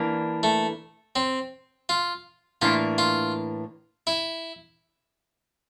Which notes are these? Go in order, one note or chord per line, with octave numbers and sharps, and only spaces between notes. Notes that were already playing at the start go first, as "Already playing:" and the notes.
Already playing: E3 A#3 D4
A3
C4
F4
A2 E3 A#3 D4 F4
F4
E4